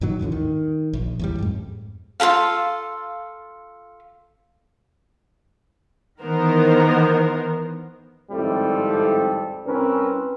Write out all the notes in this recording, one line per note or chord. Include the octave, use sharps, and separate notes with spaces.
G2 A#2 D#3 F#3
A1 D#2 A2 D3
D#3
A#1
E2 A2 G3
F2 G#2
F4 G#4 A4 F5
D#3 E3 B3 A#4 C5
G#1 F2 A2 G3 C4 A4
C2 C4 C#4 A#4 B4